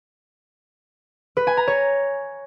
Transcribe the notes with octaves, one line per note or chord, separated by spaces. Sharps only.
B4
G#5
A#5
C#5